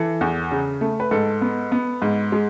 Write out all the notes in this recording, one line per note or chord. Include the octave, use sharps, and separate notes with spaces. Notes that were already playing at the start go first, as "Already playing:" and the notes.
Already playing: E3 A4
E2
C#3
A3
B4
G#2 A4
B3
B3
G#2
G#3